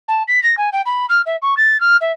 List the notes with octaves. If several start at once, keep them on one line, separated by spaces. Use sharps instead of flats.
A5
B6
A#6
G#5
G5
B5
F6
E5
C#6
A6
F6
E5